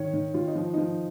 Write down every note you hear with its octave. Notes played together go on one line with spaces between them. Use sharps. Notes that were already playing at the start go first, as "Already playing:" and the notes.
Already playing: D#3 C#5
D#3
D#3 F4
D#4
F3
F3 D#4